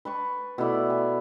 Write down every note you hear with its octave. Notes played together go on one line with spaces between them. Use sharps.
B4 A5 C#6
B2 A3 E4 D5
G#5